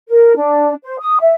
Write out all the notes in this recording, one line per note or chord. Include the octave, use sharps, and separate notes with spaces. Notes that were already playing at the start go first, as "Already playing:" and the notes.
A#4
D4
C5
D#6
E5